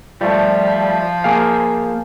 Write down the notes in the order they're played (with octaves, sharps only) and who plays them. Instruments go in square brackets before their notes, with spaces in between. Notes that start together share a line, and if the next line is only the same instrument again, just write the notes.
[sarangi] F3 [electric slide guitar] G3 A3
[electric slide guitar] A#3 G#4 F5